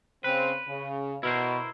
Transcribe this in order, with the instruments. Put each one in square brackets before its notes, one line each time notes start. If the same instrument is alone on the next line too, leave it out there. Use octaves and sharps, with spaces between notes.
[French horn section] C#3 C4 [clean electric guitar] B4
[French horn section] C#3
[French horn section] B2 [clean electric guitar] E4 A#4 C5